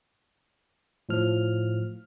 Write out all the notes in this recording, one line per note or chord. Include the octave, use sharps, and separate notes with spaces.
A2 F3 F6